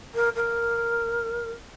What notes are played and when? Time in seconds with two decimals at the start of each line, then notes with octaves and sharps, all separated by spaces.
0.14 A#4
0.35 A#4